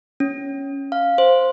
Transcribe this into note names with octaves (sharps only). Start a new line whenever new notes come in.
C#4
F5
C5